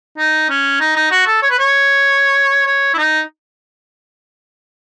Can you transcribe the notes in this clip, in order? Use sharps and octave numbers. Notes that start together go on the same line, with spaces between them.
D#4
C#4
D#4
D#4
F#4
A4
C#5
B4
C#5
C#5
E4
D#4